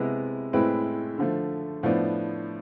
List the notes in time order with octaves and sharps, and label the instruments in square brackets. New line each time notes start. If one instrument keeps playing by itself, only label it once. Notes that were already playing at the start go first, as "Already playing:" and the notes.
Already playing: [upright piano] C3 G#3 B3 E4
A2 G#3 C4 E4 B4
D3 F3 A3
A2 F3 B3 D4